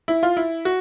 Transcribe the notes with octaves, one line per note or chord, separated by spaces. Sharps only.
E4
F4
E4
F#4